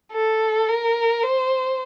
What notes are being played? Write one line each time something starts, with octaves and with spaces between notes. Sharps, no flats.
A4
A#4
C5